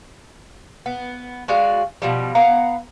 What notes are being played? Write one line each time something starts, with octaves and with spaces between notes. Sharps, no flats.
B3
G#3 F#4 D5 F5
B2 F3 G3
B3 F5 F#5 A#5